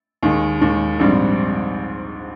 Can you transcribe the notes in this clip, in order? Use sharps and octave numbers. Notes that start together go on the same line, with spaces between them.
D#2 D#3 G#3
D#2 D#3 G#3
A#1 G#2 G3 C4